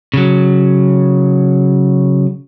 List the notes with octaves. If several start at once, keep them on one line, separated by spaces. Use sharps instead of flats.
C#3 F#3